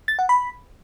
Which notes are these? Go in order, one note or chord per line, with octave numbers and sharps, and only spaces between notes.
A6
F#5
B5